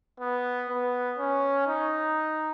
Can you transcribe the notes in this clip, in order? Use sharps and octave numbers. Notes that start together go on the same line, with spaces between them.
B3
B3
C#4
D#4